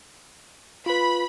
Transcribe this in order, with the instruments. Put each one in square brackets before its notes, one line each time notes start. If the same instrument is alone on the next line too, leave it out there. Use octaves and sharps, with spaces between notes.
[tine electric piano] F4 B4 [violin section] B5